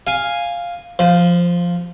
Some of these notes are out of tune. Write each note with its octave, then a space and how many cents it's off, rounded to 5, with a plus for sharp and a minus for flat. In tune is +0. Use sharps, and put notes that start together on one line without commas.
F5 +0 G#5 -10
F3 +0 C5 -35